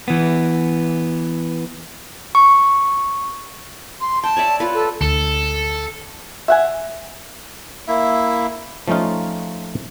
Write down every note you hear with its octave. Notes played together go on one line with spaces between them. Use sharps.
E3 B3
C#6
C6
G5 A5
C#5 D5 E5
F4 B4
A4
D2 A4
E5 F#5 G#5
A#3 E4 E5
F3 A3 C#4 D#4 F4